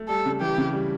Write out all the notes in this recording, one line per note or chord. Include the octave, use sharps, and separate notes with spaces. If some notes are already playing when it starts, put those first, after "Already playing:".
Already playing: A3
G3 A4
C#3
E3 G4
C#3
G3